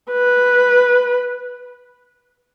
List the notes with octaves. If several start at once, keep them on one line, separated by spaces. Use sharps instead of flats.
B4